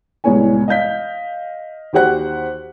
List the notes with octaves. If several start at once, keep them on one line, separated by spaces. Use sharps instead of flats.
C2 A2 G#3 B3 C#5 G#5
D#5 F5 G6 B6
D#2 F#4 G4 C5 F#5 F#6